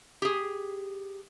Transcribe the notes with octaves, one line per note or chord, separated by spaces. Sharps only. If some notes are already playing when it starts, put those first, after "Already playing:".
G4 G#4